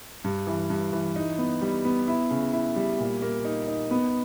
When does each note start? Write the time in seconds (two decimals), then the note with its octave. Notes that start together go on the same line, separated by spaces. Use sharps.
0.24 G2
0.47 E3
0.70 G2
0.93 E3
1.16 D#4
1.38 B3
1.62 G3
1.85 B3
2.08 E4
2.31 C#3
2.53 E4
2.76 G3
2.99 A#2
3.22 A#3
3.45 D#4
3.68 D#4
3.91 B3